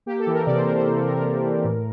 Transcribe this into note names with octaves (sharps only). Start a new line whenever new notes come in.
A#3 G4
A4
E3
A#4
C3 D5
C5
E3 A#4
C5
A#3
A4
C3 A#4
A#4
A#3
E3
A2